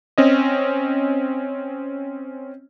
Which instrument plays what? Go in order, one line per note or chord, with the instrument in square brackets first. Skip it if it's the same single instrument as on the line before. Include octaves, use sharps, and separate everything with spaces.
[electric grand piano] C4 C#4 D#5